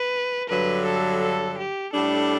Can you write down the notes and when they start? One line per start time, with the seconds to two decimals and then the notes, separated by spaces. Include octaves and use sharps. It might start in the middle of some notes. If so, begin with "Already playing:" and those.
Already playing: B4
0.49 G2 D3 F#3 B4
0.86 A4
1.21 A4
1.58 G4
1.94 A2 G3 D4 A4